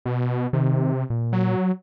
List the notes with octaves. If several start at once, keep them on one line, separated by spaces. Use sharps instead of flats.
B2
C3 D#3
A#2
F#3